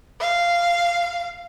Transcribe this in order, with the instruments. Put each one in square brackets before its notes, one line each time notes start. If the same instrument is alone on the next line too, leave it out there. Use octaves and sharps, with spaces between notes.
[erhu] F5